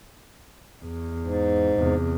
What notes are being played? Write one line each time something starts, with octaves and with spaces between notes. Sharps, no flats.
E2
G#2
E2 C3